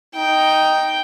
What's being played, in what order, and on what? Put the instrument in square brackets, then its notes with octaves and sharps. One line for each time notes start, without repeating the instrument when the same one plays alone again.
[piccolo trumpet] D#4 [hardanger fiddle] G5